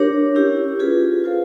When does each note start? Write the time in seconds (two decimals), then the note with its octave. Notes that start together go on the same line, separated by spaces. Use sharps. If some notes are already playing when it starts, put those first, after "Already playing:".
Already playing: D4 G4 A#4 C#5
0.35 C#4 E4 G4
0.79 F4 G#4 B4
1.24 F4 A4 C5 F5